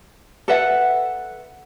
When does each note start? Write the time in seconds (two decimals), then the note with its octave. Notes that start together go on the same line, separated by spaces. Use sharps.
0.48 A4 B4 E5 F#5